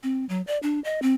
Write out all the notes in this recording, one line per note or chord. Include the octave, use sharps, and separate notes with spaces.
C4
F#3
D5
D4
D#5
C4